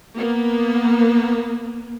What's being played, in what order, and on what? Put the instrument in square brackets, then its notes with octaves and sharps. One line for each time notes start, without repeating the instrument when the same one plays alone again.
[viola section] A#3 B3